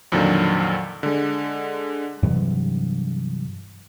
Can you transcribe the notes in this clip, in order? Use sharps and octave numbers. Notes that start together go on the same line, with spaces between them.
F2 A#2 D3 D#3 F#3
D3 G#3
G2 C3 E3 F#3